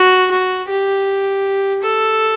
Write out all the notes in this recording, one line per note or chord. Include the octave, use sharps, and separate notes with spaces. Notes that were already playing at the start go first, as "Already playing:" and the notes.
Already playing: F#4
F#4
G4
A4